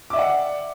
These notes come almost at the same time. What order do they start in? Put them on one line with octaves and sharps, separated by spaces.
D6 E5 D5 F#5